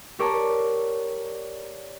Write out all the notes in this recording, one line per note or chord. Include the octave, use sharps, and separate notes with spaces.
G4 A#4 C#5 D5 A5 A#5